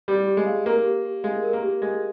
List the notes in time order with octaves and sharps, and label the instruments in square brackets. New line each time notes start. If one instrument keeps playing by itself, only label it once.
[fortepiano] G3 [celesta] G4
[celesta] G4
[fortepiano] G#3
[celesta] F5
[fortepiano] A#3 [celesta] A#4
[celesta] G4
G4
[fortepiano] G#3 [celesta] F5
[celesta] A#4
[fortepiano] A#3
[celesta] G4
[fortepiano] G#3 [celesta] G4